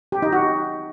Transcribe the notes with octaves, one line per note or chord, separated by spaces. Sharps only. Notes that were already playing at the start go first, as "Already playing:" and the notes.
G4
D#4
F#4